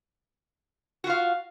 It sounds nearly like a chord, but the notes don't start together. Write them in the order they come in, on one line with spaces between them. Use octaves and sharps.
F#4 F4 F5